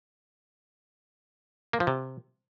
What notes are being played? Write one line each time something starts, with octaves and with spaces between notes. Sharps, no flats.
A#3
F3
C3